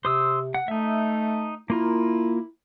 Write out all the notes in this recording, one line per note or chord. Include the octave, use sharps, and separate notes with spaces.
C3 C5 D#6 E6
F#5
A3 D#4 E5
A#3 E4 F4 A#4